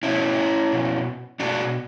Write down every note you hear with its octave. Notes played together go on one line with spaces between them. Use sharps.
B2 C#4 E4
B2
B2 D4 F#4